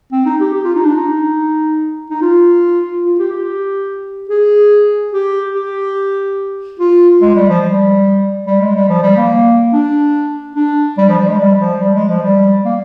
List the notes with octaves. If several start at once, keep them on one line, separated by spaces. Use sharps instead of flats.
C4
D#4
G4
G4
F4
D#4
D4
D#4
D#4
F4
F4
G4
G4
G#4
G4
G4
F4
G#3
G3
F3
G3
G3
G#3
G3
F3
G3
A#3
D4
D4
G3
F3
G3
G#3
G3
F3
G3
G#3
F3
G3
A#3